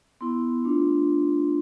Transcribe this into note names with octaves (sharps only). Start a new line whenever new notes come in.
B3 E4 C6
A3 D4 F4